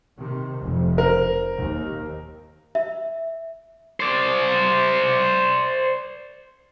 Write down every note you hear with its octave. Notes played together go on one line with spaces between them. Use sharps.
C3 D#3
F1 F2
A#4 C5
D#2
E5
C5 D5